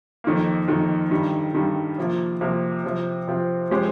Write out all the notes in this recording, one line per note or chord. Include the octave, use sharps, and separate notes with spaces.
F2 D#3 A#3
F2 D#3 A#3
G2 D#3 G3
G2 D#3 G3
C3 F3 A#3 F4
C3 F3 A#3 F4
C3 F3 C4 F4
C3 F3 C4 F4
F3 G#3 C#4 G4 C5